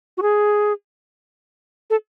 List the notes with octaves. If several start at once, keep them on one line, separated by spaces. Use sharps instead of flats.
F#4
G#4
A4